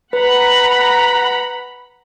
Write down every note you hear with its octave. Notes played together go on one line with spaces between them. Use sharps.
B4 F#5 A#5 B5